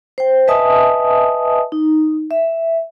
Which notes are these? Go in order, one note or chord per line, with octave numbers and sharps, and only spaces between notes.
C5 G5
B4 D#5 E5 G#5 A5 D#6
D#4
E5